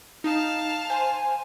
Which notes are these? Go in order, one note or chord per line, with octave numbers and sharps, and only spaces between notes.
D#4 F5 A5
C5 G#5